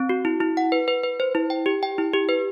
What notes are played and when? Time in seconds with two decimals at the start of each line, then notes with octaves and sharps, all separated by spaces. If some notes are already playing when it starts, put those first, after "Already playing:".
Already playing: C4
0.09 F#4
0.25 E4
0.41 E4
0.57 F#5
0.72 B4
0.88 B4
1.03 B4
1.20 C5
1.35 E4
1.50 G5
1.66 G4
1.83 G5
1.98 E4
2.14 G4
2.29 B4